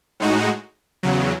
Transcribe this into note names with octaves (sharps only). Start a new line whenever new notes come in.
A2 G#3 D#4 F#4
E2 C#3 F#3